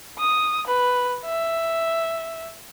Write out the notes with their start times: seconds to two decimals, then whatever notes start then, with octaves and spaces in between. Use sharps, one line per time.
0.19 D#6
0.67 B4
1.26 E5